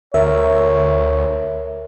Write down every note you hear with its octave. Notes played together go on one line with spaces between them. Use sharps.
D2 A#4 C#5 E5